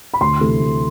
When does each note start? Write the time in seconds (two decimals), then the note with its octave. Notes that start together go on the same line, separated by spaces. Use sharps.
0.14 B5
0.21 D2 C6
0.40 C3 E3 A3
0.60 D2